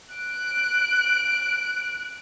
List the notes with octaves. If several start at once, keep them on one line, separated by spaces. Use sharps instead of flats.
F#6 D7